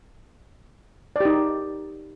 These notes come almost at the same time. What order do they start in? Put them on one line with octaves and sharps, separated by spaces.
D5 G4 D#4